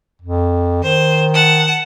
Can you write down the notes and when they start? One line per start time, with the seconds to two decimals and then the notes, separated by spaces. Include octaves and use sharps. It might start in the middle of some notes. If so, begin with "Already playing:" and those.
0.22 F2
0.83 D#3 C5
1.34 F#5 A5